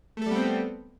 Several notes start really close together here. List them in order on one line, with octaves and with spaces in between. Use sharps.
A3 A4 G3 B3 C4